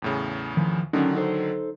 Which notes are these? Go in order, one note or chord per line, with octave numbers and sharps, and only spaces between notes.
E2 A2 C#3
D#3 F3
D3 D#3 F#3 C#4 D#4
D#4 A4 C5